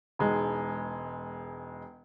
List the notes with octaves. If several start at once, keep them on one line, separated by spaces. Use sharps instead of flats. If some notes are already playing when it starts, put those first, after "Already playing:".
E1 G#3 D#4